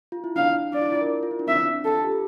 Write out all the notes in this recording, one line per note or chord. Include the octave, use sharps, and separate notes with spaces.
F4
E4
D4 F5
D4 D5
E4
F4
A#4
F4
E4
D4
C4 E5
C4
D4
A4
F4
G4
A4